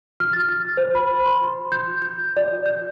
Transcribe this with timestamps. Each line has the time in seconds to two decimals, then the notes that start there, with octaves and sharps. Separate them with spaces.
0.20 F6
0.33 A6
0.49 F6
0.77 C5
0.95 B5
1.26 C6
1.43 C6
1.72 G6
2.02 G6
2.37 D5
2.66 G6